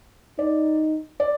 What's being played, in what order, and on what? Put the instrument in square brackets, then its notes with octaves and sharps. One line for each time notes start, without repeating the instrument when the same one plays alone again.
[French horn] D#4 [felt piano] D5
[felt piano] D5